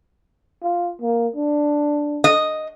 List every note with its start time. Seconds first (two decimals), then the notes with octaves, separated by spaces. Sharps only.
0.63 F4
1.02 A#3
1.36 D4
2.24 D#5